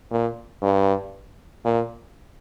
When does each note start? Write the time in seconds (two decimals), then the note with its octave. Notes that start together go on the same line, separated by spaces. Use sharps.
0.11 A#2
0.63 G2
1.65 A#2